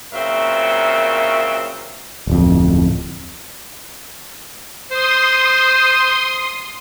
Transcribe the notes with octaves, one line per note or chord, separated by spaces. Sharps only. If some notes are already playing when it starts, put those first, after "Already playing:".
A#2 C#3 F#3 C4 A#4 E5
D1 F2
C5 C6 D#6